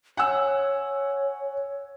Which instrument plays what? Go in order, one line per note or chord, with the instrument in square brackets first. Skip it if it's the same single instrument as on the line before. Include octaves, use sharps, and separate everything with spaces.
[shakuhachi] C#5 [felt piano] F#5 G#5 E6